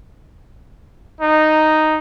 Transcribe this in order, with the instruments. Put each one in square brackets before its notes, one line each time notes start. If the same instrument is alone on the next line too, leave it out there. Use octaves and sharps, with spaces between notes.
[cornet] D#4